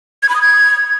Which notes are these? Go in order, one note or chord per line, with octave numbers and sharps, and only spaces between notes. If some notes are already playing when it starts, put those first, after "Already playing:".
G#6
B5
D#6
G#6